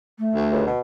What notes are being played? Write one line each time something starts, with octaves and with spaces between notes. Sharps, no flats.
A3
D2
C#2
B2